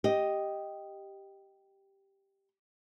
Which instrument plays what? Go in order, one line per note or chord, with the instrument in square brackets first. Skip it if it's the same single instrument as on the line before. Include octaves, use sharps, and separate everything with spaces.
[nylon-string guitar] G4 D#5